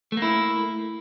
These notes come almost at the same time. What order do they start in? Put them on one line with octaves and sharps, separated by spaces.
A3 A#3 E4